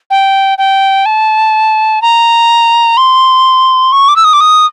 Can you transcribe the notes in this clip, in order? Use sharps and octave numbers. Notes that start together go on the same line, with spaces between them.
G5
G5
A5
A#5
C6
C#6
D6
E6
D#6
D6
D#6